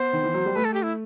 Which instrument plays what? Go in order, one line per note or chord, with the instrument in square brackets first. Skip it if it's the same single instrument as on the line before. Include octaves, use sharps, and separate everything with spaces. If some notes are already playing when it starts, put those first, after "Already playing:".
Already playing: [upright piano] B3 [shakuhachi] C5
[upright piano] D#3
E3
F#3
G3
[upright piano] A3 [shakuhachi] B4
[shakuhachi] A4
G4
E4